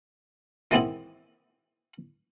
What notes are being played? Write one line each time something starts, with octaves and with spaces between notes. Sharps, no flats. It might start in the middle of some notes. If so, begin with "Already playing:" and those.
D#3 E3 G#3 B3 C4 E4